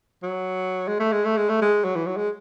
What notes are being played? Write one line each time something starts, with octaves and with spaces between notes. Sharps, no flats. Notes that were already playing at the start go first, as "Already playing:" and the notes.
F#3
G#3
A3
G#3
A3
G#3
A3
G#3
F#3
E3
F#3
G#3